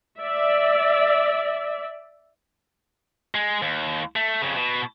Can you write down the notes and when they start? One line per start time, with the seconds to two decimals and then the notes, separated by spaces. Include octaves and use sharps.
0.21 D5 E5
3.35 G#3
3.62 D#2
4.16 A3
4.42 F2 C#3
4.56 B2